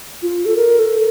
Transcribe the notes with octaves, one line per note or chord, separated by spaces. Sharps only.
F4
A4
A#4
A4